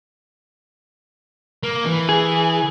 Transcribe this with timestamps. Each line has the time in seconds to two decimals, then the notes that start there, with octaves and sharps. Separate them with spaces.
1.63 A#3
1.86 E3
2.09 G#4